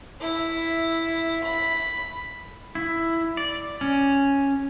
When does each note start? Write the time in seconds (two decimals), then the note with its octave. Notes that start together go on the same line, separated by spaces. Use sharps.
0.21 E4
1.44 B5
2.75 E4
3.37 D5
3.81 C#4